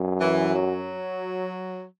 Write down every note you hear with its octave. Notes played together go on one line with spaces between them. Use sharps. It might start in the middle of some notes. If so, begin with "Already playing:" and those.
Already playing: F#2
E3
F#3